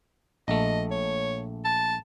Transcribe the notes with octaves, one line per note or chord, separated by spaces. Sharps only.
A#1 A3 D#5
C#5
A5